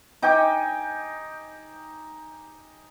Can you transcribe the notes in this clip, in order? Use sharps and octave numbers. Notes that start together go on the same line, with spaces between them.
D#4 G5 G#5 D6